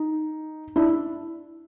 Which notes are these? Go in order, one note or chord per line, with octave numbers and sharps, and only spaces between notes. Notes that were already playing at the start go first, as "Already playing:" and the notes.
Already playing: D#4
D4 E4